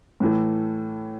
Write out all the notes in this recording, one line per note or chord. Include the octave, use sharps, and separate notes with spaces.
A2 E3 A3